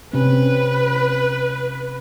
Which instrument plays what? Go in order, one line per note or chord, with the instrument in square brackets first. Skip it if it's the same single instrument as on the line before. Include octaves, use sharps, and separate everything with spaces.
[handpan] C3 C4 C#4 [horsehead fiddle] B4